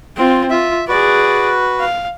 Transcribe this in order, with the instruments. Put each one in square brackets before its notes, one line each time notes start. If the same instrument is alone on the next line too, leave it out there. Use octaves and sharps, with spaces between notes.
[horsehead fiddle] C4 F4
[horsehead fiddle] F4 [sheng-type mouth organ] E5
[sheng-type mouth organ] F#4 B4 [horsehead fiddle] G#4 D5
[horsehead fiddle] F5